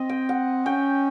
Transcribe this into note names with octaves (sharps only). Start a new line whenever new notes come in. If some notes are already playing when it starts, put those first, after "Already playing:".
Already playing: C4 D#5
G5
F#5
C#4 G5